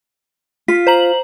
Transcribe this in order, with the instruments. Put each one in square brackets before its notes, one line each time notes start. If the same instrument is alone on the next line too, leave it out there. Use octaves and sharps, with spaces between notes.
[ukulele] F4 [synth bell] B6
[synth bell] C5 A#5 F#7